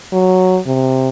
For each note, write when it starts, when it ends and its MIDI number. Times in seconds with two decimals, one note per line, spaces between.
0.12 0.58 54
0.66 1.09 48